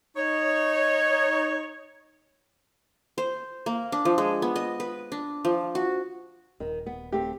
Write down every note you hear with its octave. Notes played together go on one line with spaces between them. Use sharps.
D#4 C#5
C5
A#3
D4
F3
G#3
B3
D#5
B4
D4
F3
F#4
D#1 D#3
B3
A3 C4 G4